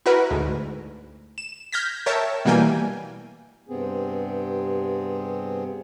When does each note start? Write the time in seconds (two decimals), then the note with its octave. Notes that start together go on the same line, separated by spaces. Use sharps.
0.06 E4 F#4 A#4 B4
0.31 D2 G#2
1.38 E7
1.72 F6 G6 G#6 A#6 B6
2.06 A#4 C#5 E5 G5 A5
2.45 B2 E3 G3 A#3 G5 G#5
3.69 G2 C3 B3 C4 G#4